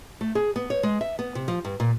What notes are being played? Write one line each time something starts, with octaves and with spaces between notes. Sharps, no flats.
A3
G#4
B3
C#5
G#3
E5
B3
C3
F3
G2
A#2